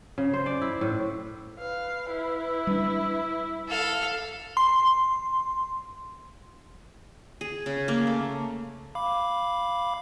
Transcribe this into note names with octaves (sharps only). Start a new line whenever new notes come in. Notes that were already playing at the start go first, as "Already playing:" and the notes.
C#3
C5
D5
E4
A2
B4 F5
E4
G3 D4
A4 F5
C6
G#4
C#3
A#3
A3
F5 B5 D6